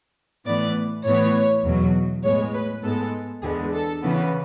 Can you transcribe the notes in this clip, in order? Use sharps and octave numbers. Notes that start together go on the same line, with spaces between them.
A2 E3 B3 D5
A2 E3 B3 C#5
E2 B2 F#3
A2 G#3 B3 C#5
B4
G#2 G#3 B3 A4
E2 D3 G#3 B3 G#4
A4
C#3 E3 B3